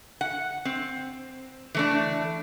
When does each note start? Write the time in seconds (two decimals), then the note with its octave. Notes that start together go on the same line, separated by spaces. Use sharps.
0.21 F#5
0.65 C4
1.75 E3 A3 D4